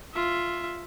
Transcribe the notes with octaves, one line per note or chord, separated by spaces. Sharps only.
F4 E5